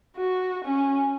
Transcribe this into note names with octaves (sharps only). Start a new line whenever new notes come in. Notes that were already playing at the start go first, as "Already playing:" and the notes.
F#4
C#4